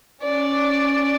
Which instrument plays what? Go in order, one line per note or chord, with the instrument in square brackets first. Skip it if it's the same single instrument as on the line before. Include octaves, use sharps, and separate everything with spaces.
[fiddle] C#4 D5